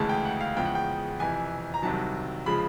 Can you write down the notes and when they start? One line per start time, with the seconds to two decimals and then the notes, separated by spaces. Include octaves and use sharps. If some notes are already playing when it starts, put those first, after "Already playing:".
Already playing: D2 C#3 E3 G#3 A5
0.09 G5
0.25 F#5
0.40 F5
0.57 E2 C#3 F3 G#3 G5
0.65 F#5
0.75 G5
1.19 F2 C3 E3 G#5
1.74 A#5
1.83 C2 C3 D#3 F#3 A5
2.46 C#3 F3 G#3 B5